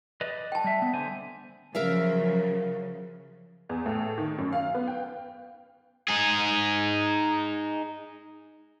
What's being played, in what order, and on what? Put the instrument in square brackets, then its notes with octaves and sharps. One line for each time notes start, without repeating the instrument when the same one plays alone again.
[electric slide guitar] B4 D5 D#5
[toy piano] G5 A5
[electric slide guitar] G3 E5
B3
D3 C5 G#5
[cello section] C#3 F3 F#3 [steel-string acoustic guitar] A#4 E5 F5
[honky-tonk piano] E2
A2
D#3
F#2
F5
B3
G5
[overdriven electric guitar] D#4 G#4